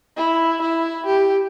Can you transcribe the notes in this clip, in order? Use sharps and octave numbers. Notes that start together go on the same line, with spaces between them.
E4
E4
G4